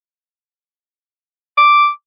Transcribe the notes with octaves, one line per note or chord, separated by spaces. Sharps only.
D6